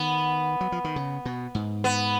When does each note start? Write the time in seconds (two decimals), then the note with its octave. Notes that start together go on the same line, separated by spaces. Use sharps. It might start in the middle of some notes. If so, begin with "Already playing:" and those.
Already playing: D#3 B3
0.61 F#3
0.72 F3
0.84 D#3
0.96 C#3
1.25 B2
1.55 G#2
1.84 B3